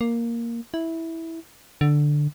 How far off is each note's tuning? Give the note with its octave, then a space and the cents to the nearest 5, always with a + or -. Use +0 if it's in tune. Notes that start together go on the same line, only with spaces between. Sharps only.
A#3 +0
E4 -10
D3 +5